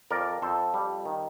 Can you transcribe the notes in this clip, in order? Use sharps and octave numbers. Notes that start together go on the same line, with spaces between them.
F2 A#4 D5
F2 A4 C5
G3
D#3